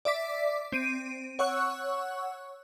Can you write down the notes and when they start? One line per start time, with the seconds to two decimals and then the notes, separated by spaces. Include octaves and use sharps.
0.05 D5 E5 D6 B6
0.72 C4 D7 D#7
1.39 C#5 F#5 C#6 E6 F#6